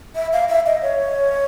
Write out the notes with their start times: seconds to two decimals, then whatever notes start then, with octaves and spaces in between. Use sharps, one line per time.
0.15 E5
0.33 F5
0.49 E5
0.66 D#5
0.82 C#5